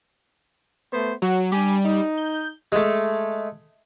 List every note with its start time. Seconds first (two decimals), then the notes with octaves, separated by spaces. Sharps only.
0.92 A3 B3 C5
1.22 F#3 F#4
1.52 G3 D4 G4 G#5
1.84 D#4
2.18 G6
2.72 G#3 A3